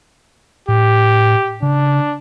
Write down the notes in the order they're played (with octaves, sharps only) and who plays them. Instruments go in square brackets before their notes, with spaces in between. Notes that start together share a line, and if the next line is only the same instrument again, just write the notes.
[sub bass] A2 [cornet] G4
[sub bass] C#3 [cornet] D4